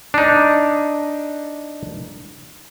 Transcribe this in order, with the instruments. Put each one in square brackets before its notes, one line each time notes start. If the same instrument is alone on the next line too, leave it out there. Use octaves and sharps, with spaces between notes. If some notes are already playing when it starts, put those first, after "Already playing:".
[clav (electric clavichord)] D4 D#4